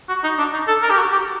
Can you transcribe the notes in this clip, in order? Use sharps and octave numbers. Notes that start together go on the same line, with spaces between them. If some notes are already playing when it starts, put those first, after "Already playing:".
F#4
D#4
D4
D#4
A4
A#4
G4
F#4
G4